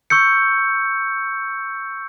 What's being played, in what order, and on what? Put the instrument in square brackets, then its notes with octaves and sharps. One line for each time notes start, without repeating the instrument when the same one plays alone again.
[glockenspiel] C#6 E6 G6 C#7